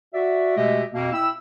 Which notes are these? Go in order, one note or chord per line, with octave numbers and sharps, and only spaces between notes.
F#4 D5 E5
B2 G#3 A3 G4 D#5 E5
F2 B2 A#3
E4 E5 G5 B5 E6